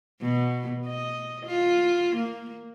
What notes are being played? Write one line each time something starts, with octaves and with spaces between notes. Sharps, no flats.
B2
D#5
F4
A#3